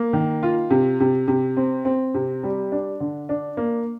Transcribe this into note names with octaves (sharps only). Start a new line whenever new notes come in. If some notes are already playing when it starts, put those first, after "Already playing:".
Already playing: A#3
D#3
F4
C3
C3
C3
C4
C4
C3
G3
D4
D3
D4
A#3